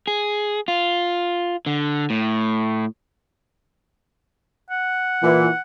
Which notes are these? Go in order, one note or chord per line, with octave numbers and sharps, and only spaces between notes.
G#4
F4
D3
A2
F#5
A#2 E3